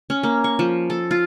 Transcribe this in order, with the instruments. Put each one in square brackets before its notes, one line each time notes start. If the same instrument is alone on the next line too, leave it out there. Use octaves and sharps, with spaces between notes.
[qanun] C#4
A#3
C#6
F3
A4
F4